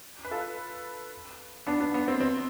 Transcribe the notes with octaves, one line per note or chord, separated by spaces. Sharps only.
B4
F4 A4
B3 D4
B3 D4
B3
C4
C4